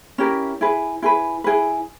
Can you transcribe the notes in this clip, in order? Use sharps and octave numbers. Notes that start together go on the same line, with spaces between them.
C#4 E4 G4 A#4
E4 G#4 B4
E4 G#4 B4
E4 G#4 B4